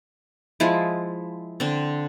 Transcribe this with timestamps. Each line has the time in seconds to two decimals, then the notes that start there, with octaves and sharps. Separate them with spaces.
0.60 F3 G#3 E4
1.60 D3 C4